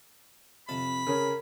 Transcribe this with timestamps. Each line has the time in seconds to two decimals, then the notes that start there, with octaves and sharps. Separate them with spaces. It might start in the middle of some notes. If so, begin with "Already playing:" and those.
0.69 F2 C3 A5 B5
1.07 C#3 C#4 G#4 A#4